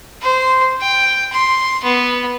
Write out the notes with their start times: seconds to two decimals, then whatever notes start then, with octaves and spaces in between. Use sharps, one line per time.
0.22 C5
0.81 G5
1.33 C6
1.84 B3